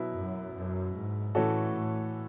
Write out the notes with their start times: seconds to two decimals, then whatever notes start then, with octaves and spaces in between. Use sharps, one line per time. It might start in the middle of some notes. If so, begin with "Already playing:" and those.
Already playing: B2 F#3 B3 E4
0.12 F#2
0.53 F#2
0.94 G#2
1.34 A2 E3 A3 C#4 F#4 A4
1.75 A2